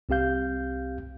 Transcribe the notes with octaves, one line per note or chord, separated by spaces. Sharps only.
C2 C4 G4 F5 G6